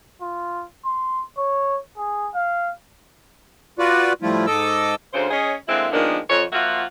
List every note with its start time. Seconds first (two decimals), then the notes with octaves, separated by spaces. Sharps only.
0.21 F4
0.85 C6
1.38 C#5
1.97 G#4
2.35 F5
3.79 F4 F#4 B4 D5
4.22 A2 F3 G3 A3 E4 F4
4.47 G#2 A4 D#5 D6 E6
5.14 D2 C#3 C5
5.31 C#4 G#4 C#5 D#5
5.68 D3 G#3 A#3 C4 E4
5.92 D#3 F3 G#3 A#3 B3 D4
6.30 F2 C#5
6.52 F3 A#3 F4 F#4 E5 F#5